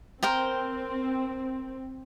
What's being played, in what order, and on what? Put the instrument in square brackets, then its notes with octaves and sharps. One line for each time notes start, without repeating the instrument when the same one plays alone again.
[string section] C4 [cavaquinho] A#4 C5 G5